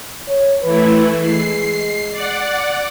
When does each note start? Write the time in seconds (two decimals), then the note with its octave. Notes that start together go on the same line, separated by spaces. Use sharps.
0.28 C#5
0.63 E3 A3 E4 B4
1.21 G#3 C7
2.11 D5 F#5